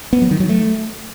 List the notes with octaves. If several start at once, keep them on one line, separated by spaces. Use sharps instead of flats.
B3
F#3
D#3
F#3
A3